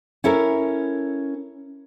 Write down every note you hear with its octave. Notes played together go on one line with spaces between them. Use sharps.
C#4 E4 A4 A#4